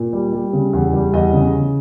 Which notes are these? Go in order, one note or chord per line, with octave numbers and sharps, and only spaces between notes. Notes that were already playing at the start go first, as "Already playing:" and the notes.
Already playing: A#2
G3
G3
C#3
E2
G3
E2 D#5
C#3